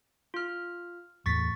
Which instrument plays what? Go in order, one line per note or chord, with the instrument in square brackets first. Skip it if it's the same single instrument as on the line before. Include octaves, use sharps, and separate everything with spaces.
[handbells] F4 F6
[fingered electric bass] E2 A2 [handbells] C#6 A6 B6